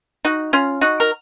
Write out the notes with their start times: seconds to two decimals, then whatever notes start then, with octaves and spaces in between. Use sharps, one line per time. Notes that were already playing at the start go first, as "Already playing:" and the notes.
0.25 D#4 F#4
0.53 C#4 F4
0.81 D#4 F#4
1.00 A#4